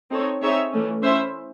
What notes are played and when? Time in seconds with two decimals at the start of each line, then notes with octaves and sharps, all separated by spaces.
0.10 C4 D#4 A4 C#5
0.41 C4 D#4 G#4 C#5 E5
0.72 E3 A3 C#4
1.03 C#4 E4 C5 E5